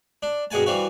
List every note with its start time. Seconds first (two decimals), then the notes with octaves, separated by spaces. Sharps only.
0.23 D4
0.51 G2 B2 G#3 F#5 G#5 A5
0.66 E3 G3 C4 F4 F#4